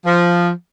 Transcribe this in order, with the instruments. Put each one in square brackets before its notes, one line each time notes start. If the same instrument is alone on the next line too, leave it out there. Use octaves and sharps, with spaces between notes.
[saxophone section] F3